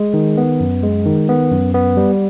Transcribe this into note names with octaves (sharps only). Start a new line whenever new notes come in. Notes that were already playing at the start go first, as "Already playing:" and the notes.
Already playing: G#3
D#3
B3
F#2
G#3
D#3
B3
F#2
B3
G3